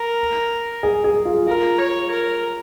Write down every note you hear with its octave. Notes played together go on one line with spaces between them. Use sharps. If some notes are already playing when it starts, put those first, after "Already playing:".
Already playing: A#4
G#4
G#4
F4
F4 A#4
C#5
A#4